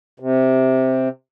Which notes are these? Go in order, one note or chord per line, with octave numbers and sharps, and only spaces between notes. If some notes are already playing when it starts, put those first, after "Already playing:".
C3